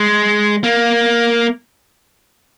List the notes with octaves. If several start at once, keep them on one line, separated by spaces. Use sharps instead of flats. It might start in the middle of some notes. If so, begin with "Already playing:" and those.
Already playing: G#3
A#3